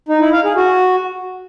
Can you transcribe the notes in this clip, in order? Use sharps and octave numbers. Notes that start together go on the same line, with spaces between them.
D#4
E4
F5
G#4
F#4